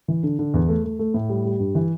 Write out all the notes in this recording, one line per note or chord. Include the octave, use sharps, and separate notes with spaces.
E3
D3
D3
E2
A3
A3
A3
A2
G3
G3
G2
E3